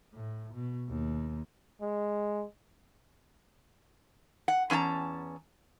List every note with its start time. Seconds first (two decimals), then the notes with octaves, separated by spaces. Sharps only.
0.13 A2
0.54 B2
0.89 D#2
1.81 G#3
4.48 F#5
4.70 E2 C#4 D#4 A5 A#5